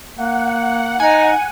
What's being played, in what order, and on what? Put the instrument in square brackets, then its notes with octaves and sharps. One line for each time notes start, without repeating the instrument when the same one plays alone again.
[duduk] A#3 [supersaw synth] F#5
[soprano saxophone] D#4 [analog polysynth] G#5